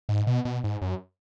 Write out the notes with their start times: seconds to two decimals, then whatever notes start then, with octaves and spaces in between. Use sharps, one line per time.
0.09 G#2
0.27 B2
0.45 B2
0.64 G#2
0.82 F#2